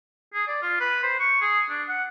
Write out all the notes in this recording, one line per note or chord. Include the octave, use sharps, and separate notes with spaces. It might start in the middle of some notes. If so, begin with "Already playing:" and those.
G#4
D5
F4
B4
C5
C#6
G#4
D4
F#5